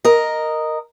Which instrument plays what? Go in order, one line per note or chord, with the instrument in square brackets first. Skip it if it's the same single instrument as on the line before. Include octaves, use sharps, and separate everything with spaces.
[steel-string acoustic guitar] A#4 D#5